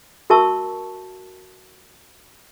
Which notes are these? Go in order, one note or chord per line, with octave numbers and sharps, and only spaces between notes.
F#4 A#4 E5 A5 C#6 E6